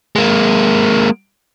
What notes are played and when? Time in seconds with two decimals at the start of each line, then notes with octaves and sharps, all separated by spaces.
0.16 G#3 A#3